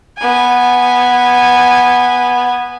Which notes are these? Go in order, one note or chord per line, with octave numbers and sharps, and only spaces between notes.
B3 G#5